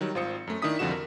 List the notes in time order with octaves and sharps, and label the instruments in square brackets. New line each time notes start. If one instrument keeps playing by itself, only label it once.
[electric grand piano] D#3 F#3 G3
G#1 F4 C5 D#6 C#7
F#2 A3
D#3 D4 E4 D#6 B6
C2 F2 D3 F3 F#4 E7
A#4